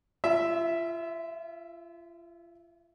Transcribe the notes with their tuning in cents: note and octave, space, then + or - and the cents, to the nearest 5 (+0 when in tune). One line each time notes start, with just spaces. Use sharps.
F4 -35 E5 +0